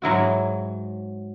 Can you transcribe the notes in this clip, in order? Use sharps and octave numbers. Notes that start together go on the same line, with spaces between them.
G#2 F#3 E4 F#4